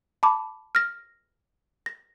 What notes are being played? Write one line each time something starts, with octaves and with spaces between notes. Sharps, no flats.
A5 B5 D6
F6 A#6
A#6